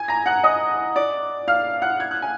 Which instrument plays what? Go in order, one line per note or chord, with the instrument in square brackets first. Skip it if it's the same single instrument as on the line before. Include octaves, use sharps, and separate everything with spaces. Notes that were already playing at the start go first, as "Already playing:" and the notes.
Already playing: [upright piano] G#5 G#6
A#5 A#6
F#5 F#6
D#5 D#6
D5 D6
F5 F6
F#5 F#6
G#6
F#6
G#5